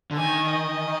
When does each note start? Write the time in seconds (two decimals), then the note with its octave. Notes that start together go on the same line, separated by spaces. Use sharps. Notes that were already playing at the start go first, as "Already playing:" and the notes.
0.11 D3
0.17 D#3 G#5
0.49 D#5